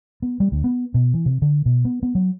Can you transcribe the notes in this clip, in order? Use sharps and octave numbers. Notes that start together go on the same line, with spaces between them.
B3
G3
D2
B3
B2
E3
C3
D3
B2
B3
B3
F#3